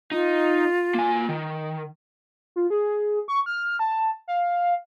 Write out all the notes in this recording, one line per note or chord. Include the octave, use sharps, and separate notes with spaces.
D#4 F4
A#3 G#5
D#3
F4
G#4
C#6
F6
A5
F5